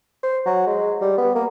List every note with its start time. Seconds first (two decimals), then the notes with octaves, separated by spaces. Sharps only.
0.23 C5
0.46 F#3
0.67 G#3
1.01 G3
1.18 B3
1.35 A#3